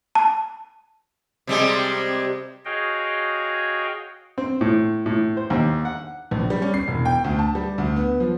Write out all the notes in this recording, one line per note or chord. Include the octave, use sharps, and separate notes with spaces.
A5
C3 G3 G#3
F#4 G#4 C#5 D#5 F5 G5
C4
A2
A2
C5
D#2
F#5
A#1
G3
C#4
C7
E1
G5
D2
A5
G3
D2
B3
F3